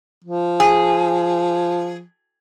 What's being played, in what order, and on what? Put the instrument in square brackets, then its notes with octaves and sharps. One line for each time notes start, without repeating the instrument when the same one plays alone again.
[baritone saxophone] F3
[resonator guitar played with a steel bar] G#4